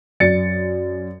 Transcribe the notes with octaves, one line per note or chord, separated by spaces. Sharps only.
F#2 D5 A6 C#7